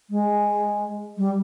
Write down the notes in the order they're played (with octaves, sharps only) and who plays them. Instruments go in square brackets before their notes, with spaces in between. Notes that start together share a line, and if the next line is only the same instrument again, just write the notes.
[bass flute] G#3
G3